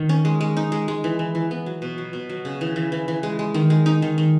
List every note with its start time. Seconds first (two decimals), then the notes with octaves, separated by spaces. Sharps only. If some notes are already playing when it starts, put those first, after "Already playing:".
Already playing: D#3
0.09 C#4
0.25 G#3
0.41 G#3
0.57 D#4
0.72 G#3
0.88 G#3
1.04 E3
1.19 E3
1.35 E3
1.51 B3
1.66 F#3
1.82 B2
1.98 F#3
2.13 B2
2.30 F#3
2.45 C#3
2.61 E3
2.76 E3
2.92 E3
3.08 E3
3.23 G#3
3.39 G#3
3.54 D#3
3.70 G#3
3.86 D#4
4.02 D#3
4.18 D#3